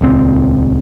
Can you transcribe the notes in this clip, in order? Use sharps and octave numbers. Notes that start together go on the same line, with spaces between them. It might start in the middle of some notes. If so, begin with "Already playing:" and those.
D#1 C#2 C4